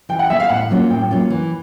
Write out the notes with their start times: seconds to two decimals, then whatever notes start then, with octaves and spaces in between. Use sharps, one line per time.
0.09 E3 G5
0.19 F#5
0.29 G#3 B3 E5
0.40 F5
0.49 A2 F#5
0.71 F#3 A#3 C#4 F4
0.90 A2 G5
1.11 F#3 A#3 C#4 F4
1.30 E3